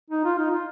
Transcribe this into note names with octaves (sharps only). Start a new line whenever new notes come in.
D#4
F4
D#4
F4